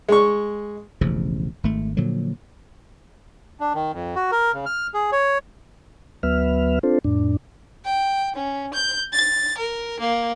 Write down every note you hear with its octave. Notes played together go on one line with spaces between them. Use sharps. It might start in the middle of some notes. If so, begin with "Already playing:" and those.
G#3 C#6
E1 A1 C#3 F3
G#1 A3
A#2 D3 F3 F#3
D4
D#3
F2
F#4
A#4
C#3
F6
G#4
C#5
D2 F#3 B3 B4 E5 F6
C4 D4 F4 A4 C5
F2 A2 D4
G5
C#4
G6
A6
A#4
A#3